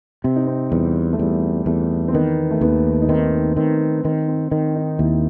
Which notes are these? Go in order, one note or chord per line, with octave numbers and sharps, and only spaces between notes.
C3 C4
D#4
C4
E2 G3
A3
E2 G3
E2 A3
C4
D#3 B3
A3
D#2 B3
D#4
D#3 C4
D#3 C4
D#3 C4
C4
D#3 C4
D#4
D#2 E4